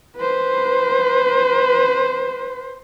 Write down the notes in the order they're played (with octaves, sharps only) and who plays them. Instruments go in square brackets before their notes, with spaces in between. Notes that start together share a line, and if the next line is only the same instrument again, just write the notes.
[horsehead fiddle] B4 C5